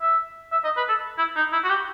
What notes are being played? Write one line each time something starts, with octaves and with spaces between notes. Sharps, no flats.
E5
E5
D#5
B4
A4
E4
D#4
E4
F#4
G4